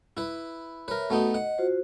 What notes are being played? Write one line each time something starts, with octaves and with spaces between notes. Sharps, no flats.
E4 B4
A#4 B4 C#5 E5
A3 B3 D#4 F#4
D#5 F#5
F4 F#4 C5